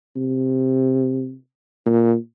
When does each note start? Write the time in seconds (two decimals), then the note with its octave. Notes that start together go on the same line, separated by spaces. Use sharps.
0.16 C3
1.86 A#2